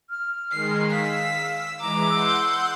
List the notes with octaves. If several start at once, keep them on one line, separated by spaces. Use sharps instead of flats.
F6
D#3 G#3 C7
F5 E6 B6
E3 G#3 A#5 D6
F#5 C6 E6 G6